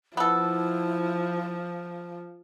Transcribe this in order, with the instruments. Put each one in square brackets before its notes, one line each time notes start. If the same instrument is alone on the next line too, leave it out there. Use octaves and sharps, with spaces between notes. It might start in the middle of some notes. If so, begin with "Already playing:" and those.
[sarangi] F3 [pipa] B3 A4 [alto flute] E4